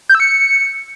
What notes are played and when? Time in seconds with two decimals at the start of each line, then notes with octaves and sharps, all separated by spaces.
0.09 G6
0.15 E6
0.20 C#7